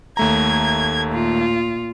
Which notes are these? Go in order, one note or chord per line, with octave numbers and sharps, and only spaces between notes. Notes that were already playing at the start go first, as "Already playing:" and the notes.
D#2 A3 A#5 G#6
A#2 F4